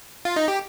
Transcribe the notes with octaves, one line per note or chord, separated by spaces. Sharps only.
F4
D#4
G4